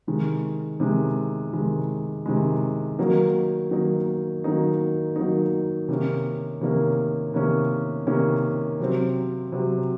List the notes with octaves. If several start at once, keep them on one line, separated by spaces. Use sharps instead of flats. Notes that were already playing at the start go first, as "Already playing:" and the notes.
C3 D#3 G#3
C3 D#3 G#3
C3 D#3 G#3
C3 D#3 G#3
D#3 F#3 A#3 D#4
D#3 F#3 A#3 D#4
D#3 F#3 A#3 D#4
D#3 F#3 A#3 D#4
C3 D#3 A#3 C#4
C3 D#3 A#3 C#4
C3 D#3 A#3 C#4
C3 D#3 A#3 C#4
C3 F#3 C4
C3 F#3 C4